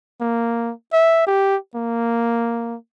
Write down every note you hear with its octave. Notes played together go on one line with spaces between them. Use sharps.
A#3
E5
G4
A#3